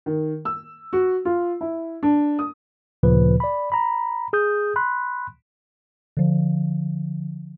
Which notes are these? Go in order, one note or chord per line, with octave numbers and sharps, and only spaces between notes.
D#3
E6
F#4
F4
E4
D4
D#6
D2 A#2 C#3 F3 B4
D5 B5
A#5 B5
G#4 D#6 G6
B5 C6 F#6
D3 F3